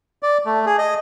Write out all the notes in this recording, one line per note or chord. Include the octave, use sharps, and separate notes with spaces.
D5
A3
G#4
D#5